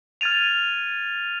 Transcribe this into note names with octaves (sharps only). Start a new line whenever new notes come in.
F6 G#6 A6 D#7 F7